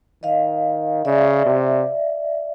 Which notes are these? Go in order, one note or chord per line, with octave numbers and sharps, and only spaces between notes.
D#3 D#5 F5
C#3 D5 E5
C3